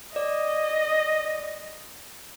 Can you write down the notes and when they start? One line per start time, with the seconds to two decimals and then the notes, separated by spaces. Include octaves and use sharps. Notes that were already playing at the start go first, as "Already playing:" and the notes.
0.16 D5 D#5